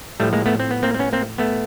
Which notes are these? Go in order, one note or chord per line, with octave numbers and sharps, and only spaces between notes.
A2 F3 G3 A3
G#3 A#3
A3 B3
C4
B3
A#3 C4
C4
B3 C#4
A#3 C4
A3 B3